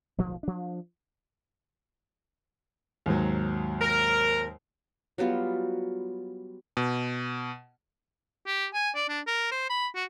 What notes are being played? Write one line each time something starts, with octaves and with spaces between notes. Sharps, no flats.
D1 B1 D#3 F3
F3 D4
D#2 G#2 F#3
A#4
F#3 G3 B3 F4
B2
G4
G#5
D5
D4
A#4
C5
B5
F#4